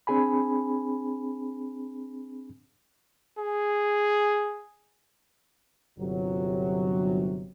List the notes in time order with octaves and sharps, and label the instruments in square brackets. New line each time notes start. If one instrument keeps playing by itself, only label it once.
[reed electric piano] C4 D4 G#4 G#5 B5
[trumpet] G#4
[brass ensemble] G1 C3 F#3